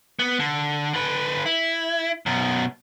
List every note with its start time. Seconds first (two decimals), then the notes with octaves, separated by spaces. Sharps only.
0.19 B3
0.39 D3
0.94 D3 B4
1.46 E4
2.26 F#2 B2